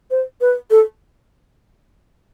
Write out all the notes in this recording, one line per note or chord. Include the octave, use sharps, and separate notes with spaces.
C5
B4
A4